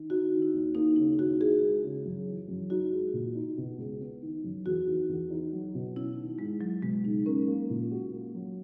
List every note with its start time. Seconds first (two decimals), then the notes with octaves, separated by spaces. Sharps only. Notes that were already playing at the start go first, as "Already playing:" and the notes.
Already playing: D#3
0.10 D#4 F#4
0.31 D#3
0.42 E4
0.54 D#2
0.75 A#3 D#4
0.96 C#3 E4
1.19 D#2 F#4
1.41 E4 G#4
1.61 G#3
1.84 C#3
2.06 F#2
2.27 E3
2.48 F#2
2.70 D#4 F#4
2.92 G#3
3.14 A#2
3.35 D#4
3.58 B2
3.78 C#2
4.00 B3
4.22 D#3
4.44 F#2
4.66 E2 F#4
4.87 D#3
5.09 E2
5.30 D#4
5.53 F#3
5.75 B2
5.96 C#4 E4
6.17 D#3
6.39 G#2 G#3
6.61 F#3 E4
6.82 B2 G#3
7.04 C#2 D#4
7.26 C#4 A#4
7.47 A#3
7.70 A#2
7.91 F#4
8.12 A#3
8.34 F#3